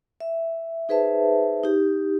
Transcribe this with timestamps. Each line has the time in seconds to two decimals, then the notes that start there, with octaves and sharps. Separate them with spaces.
0.20 E5
0.89 D#4 G#4 B4 C5 E5 A5
1.64 D#4 G4